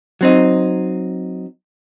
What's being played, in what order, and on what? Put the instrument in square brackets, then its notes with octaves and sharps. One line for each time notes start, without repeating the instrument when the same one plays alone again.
[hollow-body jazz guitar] F#3 C4 D#4